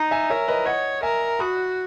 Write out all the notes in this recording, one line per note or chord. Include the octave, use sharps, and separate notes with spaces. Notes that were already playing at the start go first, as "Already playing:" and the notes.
Already playing: D#4
E5 G#5
A#4 C#5 E5
B4 D#5
C#5 D#5 F#5
A#4 E5 G#5
F#4 B5 D#6